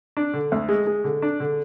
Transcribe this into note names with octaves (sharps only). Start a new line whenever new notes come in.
D4
D3
D2
G#3
G#3
D3
D4
D3